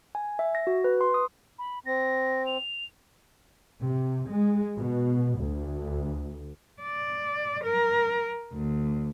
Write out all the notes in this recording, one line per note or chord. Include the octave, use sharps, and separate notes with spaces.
G#5
E5
A#6
F#4
B4
C6
D#6
B5
C4 A#6
F7
C3
G#3
B2
D2
D5
A#4
D2